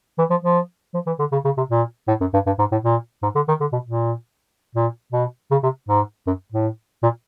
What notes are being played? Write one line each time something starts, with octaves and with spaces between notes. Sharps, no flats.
E3
F3
F3
F3
E3
D3
C#3
C#3
C3
A#2
A2
F#2
G2
G2
G#2
A2
A#2
G#2
D3
D#3
D3
B2
A#2
A#2
B2
C#3
C3
G#2
F#2
A2
A#2